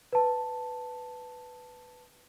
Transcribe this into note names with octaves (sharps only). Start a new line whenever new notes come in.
B4 A5